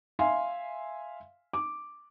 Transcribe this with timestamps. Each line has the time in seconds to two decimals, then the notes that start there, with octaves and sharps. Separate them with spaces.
0.19 E5 F5 G#5 C6
1.53 D6